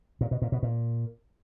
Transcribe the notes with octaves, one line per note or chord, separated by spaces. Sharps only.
A#2
B2
A#2
B2
A#2